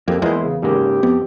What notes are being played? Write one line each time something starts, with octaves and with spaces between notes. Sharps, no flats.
F2 A#3 G4
E2 G#3 A#3 D#4 E4 C5 C6
C#3
G#2 C#3 A#3 G4
F2 B3